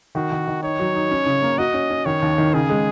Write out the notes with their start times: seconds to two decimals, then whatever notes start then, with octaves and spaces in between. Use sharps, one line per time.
0.15 D#3 F#4
0.32 D#3
0.47 D#3
0.63 D#4 C#5
0.80 F#3
0.95 D#4
1.11 C#4
1.26 C#3
1.42 A#3
1.58 F#4 D#5
1.74 C#4
1.90 C#4
2.05 D#3 C#5
2.22 D#2
2.38 D#3
2.54 C#3 G#4
2.70 G#3